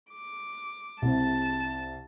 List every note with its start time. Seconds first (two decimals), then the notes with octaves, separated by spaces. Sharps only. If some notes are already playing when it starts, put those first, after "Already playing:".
0.12 D6
1.02 C2 C3 A5